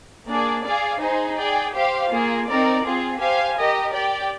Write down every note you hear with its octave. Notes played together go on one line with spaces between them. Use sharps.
A#3 D4 G#4 D5
G#4 D5 F5 G#5
D#4 G#4 C5
G#4 D5 G5
G4 C5 F5
A#3 F4 G#4
C4 D#4 A#4 D5
C4 F4 G#4
G4 C5 F5 G#5
G4 A#4 D#5
G4 D5 G5